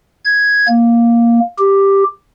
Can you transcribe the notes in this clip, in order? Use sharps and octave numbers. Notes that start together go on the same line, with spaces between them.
G#6
A#3
G4